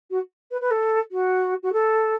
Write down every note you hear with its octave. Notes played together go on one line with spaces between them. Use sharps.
F#4
B4
B4
A4
F#4
F#4
A4